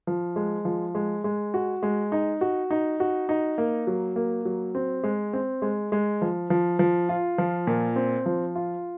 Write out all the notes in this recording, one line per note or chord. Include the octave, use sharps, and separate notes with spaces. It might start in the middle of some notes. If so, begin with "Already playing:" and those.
F3
G#3
F3
G#3
G#3
F#4
G#3
D#4
F#4
D#4
F#4
D#4
A#3
F#3
A#3
F#3
C4
G#3
C4
G#3
G#3
F3
F3
F3
F4
F3
A#2
C4
F3
F4